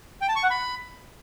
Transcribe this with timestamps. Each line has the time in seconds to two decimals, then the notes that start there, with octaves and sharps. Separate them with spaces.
0.21 G5
0.29 A5
0.36 C#6
0.43 F#5
0.50 B5